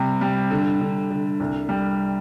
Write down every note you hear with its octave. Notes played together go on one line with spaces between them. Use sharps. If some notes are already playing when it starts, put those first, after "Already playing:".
Already playing: C3 G3
G3
D3
D3
D3
C2
G3